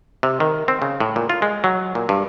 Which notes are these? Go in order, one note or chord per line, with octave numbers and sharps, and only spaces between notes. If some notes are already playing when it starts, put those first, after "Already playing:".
C3
D#3
C4
C#3
A2
A#2
F4
G#3
F#3
A#2
G2